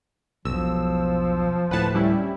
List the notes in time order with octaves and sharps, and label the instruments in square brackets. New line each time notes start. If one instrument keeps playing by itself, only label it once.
[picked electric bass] E1 B1 [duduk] F3 [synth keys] E6
[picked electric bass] D1 A2 [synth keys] B4 F#5 A5
[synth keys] G3 C#4 E4